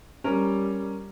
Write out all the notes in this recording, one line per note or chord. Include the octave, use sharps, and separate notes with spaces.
G3 C#4 A#4 F7